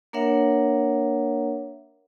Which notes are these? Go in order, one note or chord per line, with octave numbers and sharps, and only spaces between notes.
A#3 D4 A#4 C#5 E5 F#5